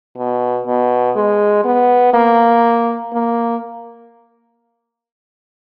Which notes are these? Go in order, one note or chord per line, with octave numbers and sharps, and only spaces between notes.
B2
B2
G#3
B3
A#3
A#3